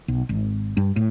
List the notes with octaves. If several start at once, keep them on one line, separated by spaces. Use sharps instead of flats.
B1
G#1
G2
A2